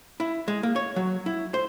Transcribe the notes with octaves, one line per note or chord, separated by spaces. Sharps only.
E4
G#3
A#3
C#5
F#3
E4
C5